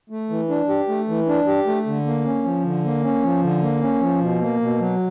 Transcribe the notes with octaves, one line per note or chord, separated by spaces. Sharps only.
A3
E3
D4
G4
A3
E3
D4
G4
A3
D3
A#3
C#4
F3
D3
A#3
C#4
F3
D3
A#3
C#4
F3
B2
A#3
B2
F#3